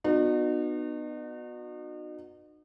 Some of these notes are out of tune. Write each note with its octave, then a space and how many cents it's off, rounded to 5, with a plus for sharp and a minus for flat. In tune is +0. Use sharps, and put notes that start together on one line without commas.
B3 +0 D#4 -40 F#4 -30